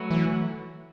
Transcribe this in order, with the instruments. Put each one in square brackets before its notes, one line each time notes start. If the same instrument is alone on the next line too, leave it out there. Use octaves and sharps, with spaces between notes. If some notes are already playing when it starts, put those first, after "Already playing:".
Already playing: [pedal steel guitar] F#3 A3 F#4 B4
[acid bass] E3